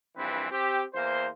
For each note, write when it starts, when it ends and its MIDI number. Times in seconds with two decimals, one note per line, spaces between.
0.16 0.46 34
0.16 0.46 43
0.16 0.46 52
0.16 0.46 60
0.16 0.46 71
0.51 0.83 60
0.51 0.83 67
0.94 1.28 40
0.94 1.28 58
0.94 1.28 72